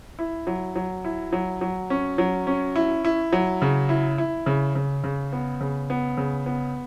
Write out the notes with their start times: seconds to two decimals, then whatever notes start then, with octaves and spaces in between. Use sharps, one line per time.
0.19 E4
0.47 F#3
0.76 F#3
1.05 E4
1.33 F#3
1.61 F#3
1.90 C#4
2.18 F#3
2.47 C#4
2.76 E4
3.05 E4
3.33 F#3
3.62 C#3
3.89 E4
4.18 E4
4.46 C#3
4.75 C#3
5.04 C#3
5.32 B3
5.61 C#3
5.90 B3
6.17 C#3
6.46 B3